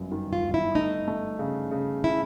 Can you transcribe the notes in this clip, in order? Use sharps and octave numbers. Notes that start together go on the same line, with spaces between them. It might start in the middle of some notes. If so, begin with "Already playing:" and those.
Already playing: G1 F#2
D#3
F4
G1
E4
A3 D#4
A3
C#3
C#3
E4